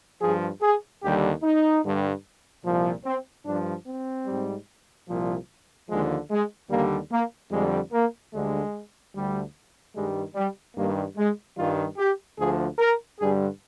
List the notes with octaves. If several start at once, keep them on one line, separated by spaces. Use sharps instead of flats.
G2 F3 G#4
G#4
D#2 D3 G3 G4
D#4
G2 D3 G3
C2 A#2 F3
C4
G2 F3 D4
C4
G#2 G3
C2 A#2 F3
D#2 D3 F3 G#3
G#3
D#2 D3 G3 A#3
A#3
F2 D3 G3 G#3
A#3
D2 D3 G3 G#3
D2 D3 G3
G2 D#3 G3 G#3
G3
G2 D#3 G3 A#3
G#3
G2 D#3 G3 F4
G4
D2 D3 F3 G#4
A#4
G2 D3 G3 G#4